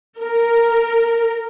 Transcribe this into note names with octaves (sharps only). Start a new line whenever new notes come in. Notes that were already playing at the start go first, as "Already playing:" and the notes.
A#4